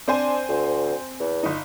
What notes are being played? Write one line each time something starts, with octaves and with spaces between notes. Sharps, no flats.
C4 D4 C5 G#5
D2
E2
G1 D#4